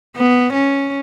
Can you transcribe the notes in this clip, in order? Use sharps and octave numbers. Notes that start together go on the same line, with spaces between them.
B3
C#4